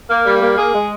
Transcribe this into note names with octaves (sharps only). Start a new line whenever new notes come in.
A#3
G3
A#3
G#4
G#3